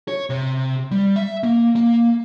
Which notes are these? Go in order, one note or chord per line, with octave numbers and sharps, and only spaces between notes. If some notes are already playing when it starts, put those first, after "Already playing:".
C#5
C3
G3
E5
A#3
A#3